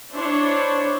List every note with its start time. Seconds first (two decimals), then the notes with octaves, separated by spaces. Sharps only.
0.13 D4 E4 C5 C#5